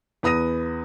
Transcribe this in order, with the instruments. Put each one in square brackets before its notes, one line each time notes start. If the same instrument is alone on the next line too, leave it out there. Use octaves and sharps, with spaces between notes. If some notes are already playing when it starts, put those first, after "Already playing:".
[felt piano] E2 B4 D#6 A#6 D#7